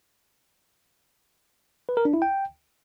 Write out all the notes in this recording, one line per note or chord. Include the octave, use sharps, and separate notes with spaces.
B4
A#4
D4
E4
G5